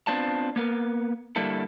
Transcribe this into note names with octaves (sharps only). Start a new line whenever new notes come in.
B3 C4 D4 F4 A5
A#3 B3 A#4
D3 G3 A#3 E4 A4